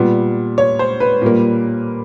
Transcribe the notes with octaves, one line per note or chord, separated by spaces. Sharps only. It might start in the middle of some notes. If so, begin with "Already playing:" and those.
Already playing: A#2 G3 B3
C#5
C5
B4
A#2 G3 A#3